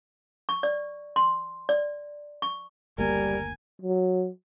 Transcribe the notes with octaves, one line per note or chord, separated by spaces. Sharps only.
C#6
D5
C6
D5
C#6
F#1 D2 G3 A#3 A#4 G#5
F#3